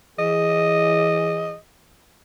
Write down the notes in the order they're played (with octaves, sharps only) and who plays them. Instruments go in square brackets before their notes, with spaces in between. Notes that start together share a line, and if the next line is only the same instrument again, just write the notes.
[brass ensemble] E3 G#4 [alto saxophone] D#5